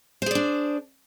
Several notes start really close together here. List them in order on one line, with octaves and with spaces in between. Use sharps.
C5 G#4 D5 D4